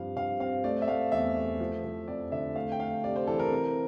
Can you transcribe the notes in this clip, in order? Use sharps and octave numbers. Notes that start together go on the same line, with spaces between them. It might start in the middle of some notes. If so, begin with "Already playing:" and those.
Already playing: G2 F3 C4 F5
G2 F5
C4 F5
A3 D5
E5
A3 F5
E2 E5
A3
F3
F3
F2 D5
D3 E5
A3 F5
G5
A3 F5
C3 D5
C5
E3 A4
A#4
C4